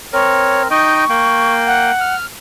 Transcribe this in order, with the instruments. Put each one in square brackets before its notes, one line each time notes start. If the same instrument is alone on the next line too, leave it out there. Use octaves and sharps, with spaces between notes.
[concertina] C4 A#4 [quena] C#5
[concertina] D#4 D#5 G5 [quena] C#6
[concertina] A#3 G5
[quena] F#5
[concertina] F6